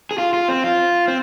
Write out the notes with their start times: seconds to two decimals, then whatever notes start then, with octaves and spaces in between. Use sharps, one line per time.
0.11 G#4
0.18 F4
0.33 F4
0.49 C4
0.64 F4
1.08 C4